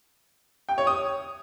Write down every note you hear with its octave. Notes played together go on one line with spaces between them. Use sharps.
G5
C#5
D#6